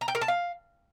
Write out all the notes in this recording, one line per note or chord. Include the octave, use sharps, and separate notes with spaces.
A#5
G5
A#4
A5
F5